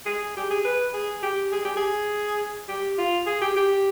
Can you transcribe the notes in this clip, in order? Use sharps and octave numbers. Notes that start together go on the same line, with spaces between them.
G#4
G4
G#4
B4
G#4
G4
G#4
G4
G#4
G4
F4
G#4
G4
G4